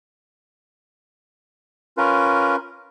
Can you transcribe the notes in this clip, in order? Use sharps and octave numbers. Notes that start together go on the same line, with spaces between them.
C#4 F4 A#4 B4